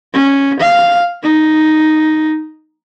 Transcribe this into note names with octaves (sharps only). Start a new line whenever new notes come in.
C#4
F5
D#4